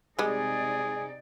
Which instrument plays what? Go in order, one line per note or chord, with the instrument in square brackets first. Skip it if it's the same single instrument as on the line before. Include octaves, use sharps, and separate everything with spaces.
[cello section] C3 D#4 D5 [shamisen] G3 G#3 [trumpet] G#4